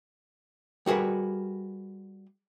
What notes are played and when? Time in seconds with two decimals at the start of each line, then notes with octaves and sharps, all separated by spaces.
0.86 G3 F#4 G#4 A#4 B4